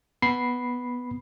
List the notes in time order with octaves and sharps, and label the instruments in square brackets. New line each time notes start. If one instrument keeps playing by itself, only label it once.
[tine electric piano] B3 B5 C7